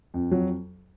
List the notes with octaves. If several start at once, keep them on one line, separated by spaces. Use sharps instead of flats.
F2
F#3